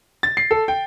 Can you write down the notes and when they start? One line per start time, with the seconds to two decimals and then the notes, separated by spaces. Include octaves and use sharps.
0.23 A6
0.37 C7
0.51 A4
0.68 G5